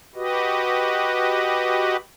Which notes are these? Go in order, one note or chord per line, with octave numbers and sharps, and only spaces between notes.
F#4 G4 B4 D#5